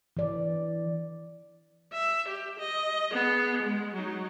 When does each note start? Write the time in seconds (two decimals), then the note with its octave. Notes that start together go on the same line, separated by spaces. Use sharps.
0.17 E3 D5
1.93 E5
2.28 G4
2.59 D#5
3.12 B3 G#4
3.62 G#3
3.94 F#3 D#4